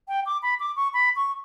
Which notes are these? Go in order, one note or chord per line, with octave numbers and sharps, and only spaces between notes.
G5
D6
B5
D6
C#6
B5
C#6